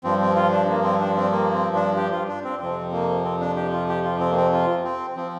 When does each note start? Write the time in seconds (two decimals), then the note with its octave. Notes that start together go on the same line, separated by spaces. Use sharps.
0.04 G2 F3 C4
0.21 C4
0.36 F4
0.52 D4
0.69 A#3
0.84 C4
1.00 D4
1.17 C4
1.32 A#3
1.54 C4
1.75 D4
1.96 G4
2.12 F4
2.28 D4
2.44 C4
2.60 F2 C3 F3 C4
2.92 A#3
3.25 C4
3.40 D4
3.56 G4
3.72 F4
3.88 G4
4.05 F4
4.20 C4
4.31 A#3
4.36 C4
4.53 F4
4.84 C4
5.16 F3 C4